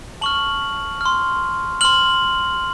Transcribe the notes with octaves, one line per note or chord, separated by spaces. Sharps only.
A5 C#6 F6 F#7
C6 F6
C6 F6 F#7